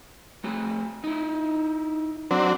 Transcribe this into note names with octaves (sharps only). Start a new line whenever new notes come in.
A3 F#4 G#4
D#4 E4
F#3 C4 D4